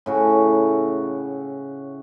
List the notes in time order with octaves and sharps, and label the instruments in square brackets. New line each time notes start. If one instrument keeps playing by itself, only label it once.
[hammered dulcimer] A2 C#3 F#4